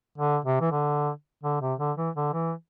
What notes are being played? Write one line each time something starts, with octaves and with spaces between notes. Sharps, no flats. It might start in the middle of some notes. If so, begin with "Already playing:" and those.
D3
C3
E3
D3
D3
C3
D3
E3
D3
E3